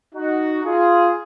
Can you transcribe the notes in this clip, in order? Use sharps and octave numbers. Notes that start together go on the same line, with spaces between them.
D#4 F#4
F4 G#4